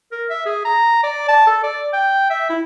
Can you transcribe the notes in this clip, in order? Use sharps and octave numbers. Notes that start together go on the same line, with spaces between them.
A#4
E5
G#4
A#5
D5
A5
A4
D5
G5
E5
E4